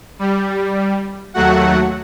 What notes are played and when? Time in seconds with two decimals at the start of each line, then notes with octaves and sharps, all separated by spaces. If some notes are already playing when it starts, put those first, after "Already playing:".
0.19 G3
1.34 D#2 F#3 A3 F#4 F#5